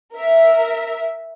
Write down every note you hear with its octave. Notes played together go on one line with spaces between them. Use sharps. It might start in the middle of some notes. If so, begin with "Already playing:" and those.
A#4 E5